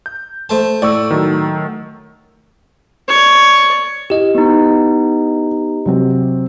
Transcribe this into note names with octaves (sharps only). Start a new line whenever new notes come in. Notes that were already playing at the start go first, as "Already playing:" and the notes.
G6
A3 C5 A5
A2 D5 C#6 E6
D#3 F#3 A3
C#5 D5
E4 G4 D#5
B3 D#4
C3 F#3 C4